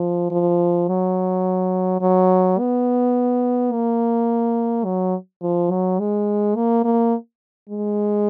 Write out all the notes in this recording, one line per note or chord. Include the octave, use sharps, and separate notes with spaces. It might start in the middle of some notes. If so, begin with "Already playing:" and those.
Already playing: F3
F3
F#3
F#3
B3
A#3
F#3
F3
F#3
G#3
A#3
A#3
G#3